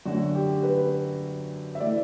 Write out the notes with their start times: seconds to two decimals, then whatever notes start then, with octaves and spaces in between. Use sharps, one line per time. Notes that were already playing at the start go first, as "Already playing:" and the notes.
0.05 F#2 D3 F#3 A3 F#4
0.34 G4
0.63 B4
1.75 E5
1.80 E3 A3 D5